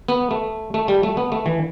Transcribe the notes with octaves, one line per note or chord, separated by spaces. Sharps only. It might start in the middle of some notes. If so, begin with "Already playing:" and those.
B3
A3
A3
G3
A3
B3
A3
E3